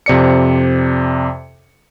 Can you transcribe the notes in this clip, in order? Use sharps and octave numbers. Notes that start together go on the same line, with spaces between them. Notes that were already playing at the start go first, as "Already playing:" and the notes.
F2 C3 D5 C#7